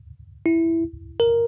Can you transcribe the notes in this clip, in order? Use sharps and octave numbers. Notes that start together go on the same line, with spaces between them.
E4
A#4